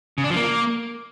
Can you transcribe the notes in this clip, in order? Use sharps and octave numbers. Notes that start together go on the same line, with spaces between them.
C#3
D4
F3
A#3